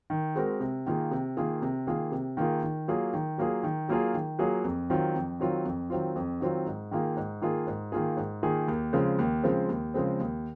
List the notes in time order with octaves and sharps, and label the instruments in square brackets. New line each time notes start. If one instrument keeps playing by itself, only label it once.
[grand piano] D#3
G#3 C4 F#4 A#4
C3
D#3 A#3 F4 G#4
C3
D#3 A#3 F4 G#4
C3
D#3 A#3 F4 G#4
C3
D#3 A#3 F4 G#4
D#3
F#3 A#3 F4 G#4
D#3
F#3 A#3 F4 G#4
D#3
F#3 A#3 F4 G#4
D#3
F#3 A#3 F4 G#4
F2
D#3 F#3 C4 F4
F2
D#3 F#3 C4 F4
F2
D#3 F#3 C4 F4
F2
D#3 F#3 C4 F4
G#2
D#3 A#3 F4 G#4
G#2
D#3 A#3 F4 G#4
G#2
D#3 A#3 F4 G#4
G#2
D#3 A#3 F4 G#4
D#2
C#3 F3 G#3 C4
D#2
C#3 F3 G#3 C4
D#2
C#3 F3 G#3 C4
D#2